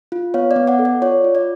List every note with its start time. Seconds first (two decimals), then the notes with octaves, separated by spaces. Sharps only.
0.12 F4
0.34 B3 C#5 F5
0.51 D5
0.56 B3
0.68 D5 F#5
0.79 A4
0.85 D5
1.02 F4 C#5
1.24 F4
1.35 D5